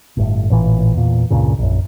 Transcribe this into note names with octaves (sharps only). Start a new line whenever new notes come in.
G1 A2
A1 A#2 E3
E2 A#2
C#2 G2 A#2 C#3
A#1 F#2